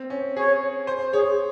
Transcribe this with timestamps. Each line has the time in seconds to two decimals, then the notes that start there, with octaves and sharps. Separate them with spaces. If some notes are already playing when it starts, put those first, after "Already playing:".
Already playing: C4
0.10 C#4
0.37 G#4 C#5
0.87 C5
1.13 G#4 C#5